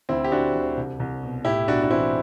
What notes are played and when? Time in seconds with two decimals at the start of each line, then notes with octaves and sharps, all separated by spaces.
0.09 D2 C4 E4
0.24 G4
0.32 D2 D4 F#4
0.55 D2
0.77 C2
1.00 C2
1.23 B2
1.45 A2 E4 G4
1.68 B1 D4 F#4
1.83 D4
1.91 E3 C4 E4